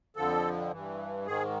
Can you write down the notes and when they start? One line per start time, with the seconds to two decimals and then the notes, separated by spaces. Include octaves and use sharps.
0.16 F2 D3 F3 A4
0.71 G2 E3
1.26 G#2 D#3 G#4